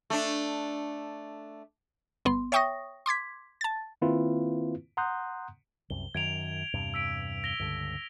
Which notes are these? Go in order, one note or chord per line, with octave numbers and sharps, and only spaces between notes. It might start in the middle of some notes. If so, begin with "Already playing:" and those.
A3 D4
G1 B3 C6
C#5 E5 G5 C#6 D#6 A#6
C6 D6 G#6 B6
A5 A6
D#3 A#3 C4 E4 F4 B4
F#5 A#5 C6 D#6 F#6 G6
C2 F#2 G7
F#2 D#3 G#6 D7 F7
E2 G2 C3
E6 B6 D7
A#6 F7 G7
C#2 G2 D3